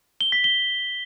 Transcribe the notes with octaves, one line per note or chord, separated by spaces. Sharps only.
G7
B6
G7